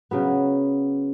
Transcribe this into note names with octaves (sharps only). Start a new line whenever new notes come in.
C#3 F#3 B3